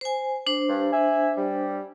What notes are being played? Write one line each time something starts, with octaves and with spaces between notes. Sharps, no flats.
C5 G#5
D4 C5
G2
E5 G#5
G3